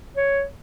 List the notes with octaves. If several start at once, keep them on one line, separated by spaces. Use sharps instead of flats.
C#5